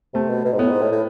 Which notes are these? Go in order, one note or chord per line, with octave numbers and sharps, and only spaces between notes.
C3 A3
B2
B2
G#2
A2 B3
G#2
A2
A2